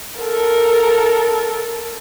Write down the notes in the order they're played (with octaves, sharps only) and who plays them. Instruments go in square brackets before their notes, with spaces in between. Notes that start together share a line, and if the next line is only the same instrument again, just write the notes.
[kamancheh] A4 A#4